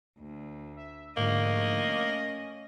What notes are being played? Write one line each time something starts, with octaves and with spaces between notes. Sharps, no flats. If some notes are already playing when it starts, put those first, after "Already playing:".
D2
E5
G#2 D3 F3 A3 A#3 D#5
C#4